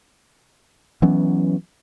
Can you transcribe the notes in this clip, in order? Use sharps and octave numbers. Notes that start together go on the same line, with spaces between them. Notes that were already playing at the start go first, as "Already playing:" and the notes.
E3 F#3 B3 C#4